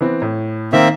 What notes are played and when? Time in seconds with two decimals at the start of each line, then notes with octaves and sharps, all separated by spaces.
0.01 E3 B3 C4
0.22 A2
0.73 D#3 A#3 C4 E5